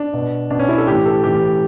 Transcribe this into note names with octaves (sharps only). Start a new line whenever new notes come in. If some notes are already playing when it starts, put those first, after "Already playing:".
Already playing: D4
B2
B2 D4
C#4
E4
A4
A2 E3 G4
A4
A2 E3 G4